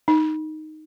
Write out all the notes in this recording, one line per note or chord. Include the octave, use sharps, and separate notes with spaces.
D#4